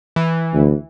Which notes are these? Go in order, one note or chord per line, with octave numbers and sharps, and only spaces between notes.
E3
D2